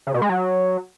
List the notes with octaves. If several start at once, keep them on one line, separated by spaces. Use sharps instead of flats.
C#3
B2
G#3
F#3